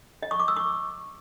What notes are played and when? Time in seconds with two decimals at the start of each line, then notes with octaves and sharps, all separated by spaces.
0.23 D#5
0.31 C#6
0.39 D6
0.48 E6
0.56 C#6